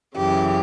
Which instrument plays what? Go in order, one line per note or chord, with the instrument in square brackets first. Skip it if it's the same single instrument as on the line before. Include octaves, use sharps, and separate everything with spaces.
[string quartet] F#2 C#3 E3 G4